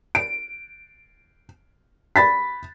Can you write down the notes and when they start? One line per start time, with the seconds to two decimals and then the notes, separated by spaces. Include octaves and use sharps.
0.15 D7
2.16 B5 A6 B6